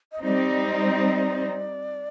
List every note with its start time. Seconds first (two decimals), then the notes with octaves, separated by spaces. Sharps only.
0.12 D#5
0.23 G3 C4 D#4 D5